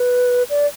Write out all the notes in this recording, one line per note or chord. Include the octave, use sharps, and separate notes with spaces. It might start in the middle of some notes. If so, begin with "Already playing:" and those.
Already playing: B4
D5